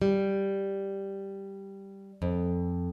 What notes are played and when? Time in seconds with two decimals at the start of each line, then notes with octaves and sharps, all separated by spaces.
0.02 G3
2.22 F2